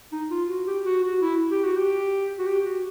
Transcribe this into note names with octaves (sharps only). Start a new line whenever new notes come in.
D#4
F4
F#4
G4
F#4
F#4
E4
G4
F#4
G4
F#4
G4
F#4